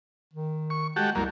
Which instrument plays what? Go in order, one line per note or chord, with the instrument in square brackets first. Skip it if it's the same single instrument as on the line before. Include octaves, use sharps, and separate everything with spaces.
[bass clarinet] D#3
[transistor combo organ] C#6
[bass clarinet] G#3 [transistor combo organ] F#4 G4 A4
[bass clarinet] C2 [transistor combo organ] F#2 A#3